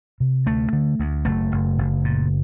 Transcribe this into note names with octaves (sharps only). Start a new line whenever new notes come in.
C3
D2 A3
D3
D2
F#1 A3
F#1
F#1
A#2